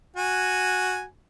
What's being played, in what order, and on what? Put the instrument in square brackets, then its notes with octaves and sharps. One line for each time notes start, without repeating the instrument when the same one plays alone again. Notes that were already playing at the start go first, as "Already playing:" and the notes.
[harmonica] F#4 G#5